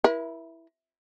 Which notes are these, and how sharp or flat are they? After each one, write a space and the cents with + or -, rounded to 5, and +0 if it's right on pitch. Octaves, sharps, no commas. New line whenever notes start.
E4 +0 A#4 +45